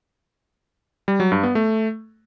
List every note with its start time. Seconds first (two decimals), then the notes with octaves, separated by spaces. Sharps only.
1.08 G3
1.20 F#3
1.32 G2
1.43 B3
1.55 A3